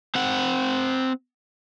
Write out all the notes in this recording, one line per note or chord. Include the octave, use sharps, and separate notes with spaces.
C4 F#5